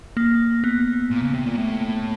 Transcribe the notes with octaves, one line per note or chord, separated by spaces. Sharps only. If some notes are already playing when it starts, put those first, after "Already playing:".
A#3
B3
A#2
C#3
C3
A#2
A2